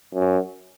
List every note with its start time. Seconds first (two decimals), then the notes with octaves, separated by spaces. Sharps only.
0.14 F#2